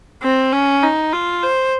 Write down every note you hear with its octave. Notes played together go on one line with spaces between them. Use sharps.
C4
C#4
D#4
F4
C5